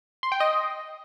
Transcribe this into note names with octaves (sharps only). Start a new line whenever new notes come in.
C6
G5
D#5